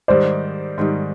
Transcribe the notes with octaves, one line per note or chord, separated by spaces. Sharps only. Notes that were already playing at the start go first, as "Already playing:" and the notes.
G#2 D#3 G3 C5 D5
G#2 D#3 G3